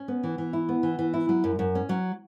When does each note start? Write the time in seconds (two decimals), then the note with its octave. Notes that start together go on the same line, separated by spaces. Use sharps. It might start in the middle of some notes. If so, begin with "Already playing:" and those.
Already playing: C#4
0.08 B3
0.23 E3
0.38 E3
0.53 E4
0.69 B3
0.83 E3
0.99 E3
1.14 E4
1.29 F#3
1.44 F#2
1.59 F#2
1.75 C#4
1.89 F#3